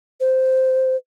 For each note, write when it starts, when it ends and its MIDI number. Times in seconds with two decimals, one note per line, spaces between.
0.20 0.96 72